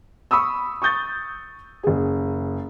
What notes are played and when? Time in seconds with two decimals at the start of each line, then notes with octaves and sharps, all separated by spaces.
0.31 B5 C#6 D#6 E6
0.82 C#6 D#6 G6 A6
1.83 F#1 G#4